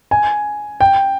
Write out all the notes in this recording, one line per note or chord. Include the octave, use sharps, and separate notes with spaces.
G#5
G5